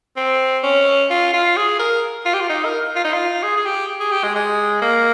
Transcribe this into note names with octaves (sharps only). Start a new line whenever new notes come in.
C4
C#4
F4
F4
G#4
A#4
F4
G4
F4
D#4
A#4
F4
D#4
F4
G#4
G#4
G4
G#4
G4
G#3
G#3
A#3